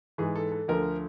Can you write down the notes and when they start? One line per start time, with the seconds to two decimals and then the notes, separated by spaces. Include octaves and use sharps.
0.18 G#2 E3 G#4
0.35 A4
0.52 A4
0.68 D2 D3 F3 A#4